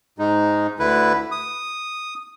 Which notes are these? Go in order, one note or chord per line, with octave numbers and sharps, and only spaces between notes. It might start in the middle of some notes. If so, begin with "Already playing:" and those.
G#2 G#3 D#4
D2 D3 E4 B4
D#6